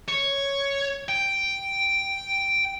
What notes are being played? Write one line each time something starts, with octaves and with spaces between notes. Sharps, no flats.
C#5
G5